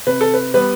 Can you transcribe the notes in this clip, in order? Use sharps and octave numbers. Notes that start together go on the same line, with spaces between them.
C3 B4
A4
B4
G3 B3 B4